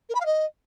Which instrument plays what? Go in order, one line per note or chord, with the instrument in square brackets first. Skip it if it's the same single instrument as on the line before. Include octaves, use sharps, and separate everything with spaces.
[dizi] A#4
B5
F5
D#5